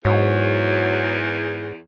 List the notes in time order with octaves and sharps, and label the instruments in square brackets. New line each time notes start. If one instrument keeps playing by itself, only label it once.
[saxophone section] E2 [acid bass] G#2 [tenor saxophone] F#3